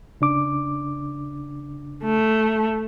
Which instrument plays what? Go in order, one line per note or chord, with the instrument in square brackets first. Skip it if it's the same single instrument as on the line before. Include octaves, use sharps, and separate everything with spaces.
[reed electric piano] C#3 D4 D6
[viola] A3